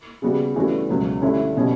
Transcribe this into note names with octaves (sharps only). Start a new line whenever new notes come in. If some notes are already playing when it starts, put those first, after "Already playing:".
C#3 G3 B3 F#4
G2 E3 A3 C#4 F#4
C#2 B2 F#3
G2 D3 A3 C#4 E4
B2 G3 C#4